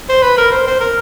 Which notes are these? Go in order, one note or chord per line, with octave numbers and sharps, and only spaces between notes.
C5
B4
A#4
C5
C5
A#4